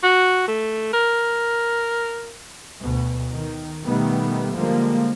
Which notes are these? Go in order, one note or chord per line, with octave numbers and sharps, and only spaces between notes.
F#4
A3
A#4
D2 B2
D#3
B2 D#3 G3 A3 B3
D3 F3 G3 G#3 A#3